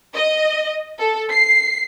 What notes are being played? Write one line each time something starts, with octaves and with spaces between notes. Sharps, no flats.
D#5
A4
C7